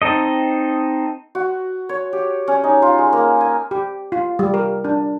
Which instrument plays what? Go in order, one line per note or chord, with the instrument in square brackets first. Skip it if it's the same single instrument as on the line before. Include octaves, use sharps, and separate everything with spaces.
[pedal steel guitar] C4 D#4 A4 D#5
[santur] F#4
C#5
G4
C#4
D#4
F4
G#3
A#3
G#5
[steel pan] G4
F4
G3
A#4
D4